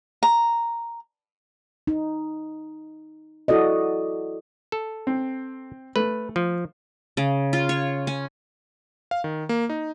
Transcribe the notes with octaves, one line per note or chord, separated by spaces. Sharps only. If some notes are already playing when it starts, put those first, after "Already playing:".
A#5
D#4
E4 F#4 A4 D5 D#5
A4
C4
A3 B4
F3
C#3
F4
C#5
C#4
F5
D#3
A#3
D#4